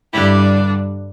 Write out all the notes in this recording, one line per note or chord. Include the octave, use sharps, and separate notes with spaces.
G2 D3 G3 D4 E4 G4